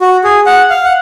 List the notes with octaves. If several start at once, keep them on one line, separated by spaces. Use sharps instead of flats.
F#4
G#4
F#5
F5
F#5